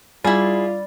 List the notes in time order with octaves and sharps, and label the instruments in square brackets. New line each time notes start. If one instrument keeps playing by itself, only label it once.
[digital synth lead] G3 [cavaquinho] E4 G#4 [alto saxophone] F4 [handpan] D5